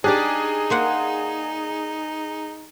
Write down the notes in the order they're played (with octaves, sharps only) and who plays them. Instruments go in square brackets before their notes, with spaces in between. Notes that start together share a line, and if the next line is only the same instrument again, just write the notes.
[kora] D4 G4 D5 [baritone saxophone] D#4 [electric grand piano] G#4
[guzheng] A#3 C5 F#5